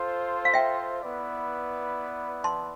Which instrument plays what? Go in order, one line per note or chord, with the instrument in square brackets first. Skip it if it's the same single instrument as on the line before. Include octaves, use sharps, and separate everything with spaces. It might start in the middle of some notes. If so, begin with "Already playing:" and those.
Already playing: [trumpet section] F4 A4 C5
[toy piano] F5
E5 G5
[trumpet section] B3 E4 B4 D5
[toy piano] A5 C6